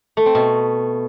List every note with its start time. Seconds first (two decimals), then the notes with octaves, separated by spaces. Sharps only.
0.17 A3
0.26 C4
0.35 B2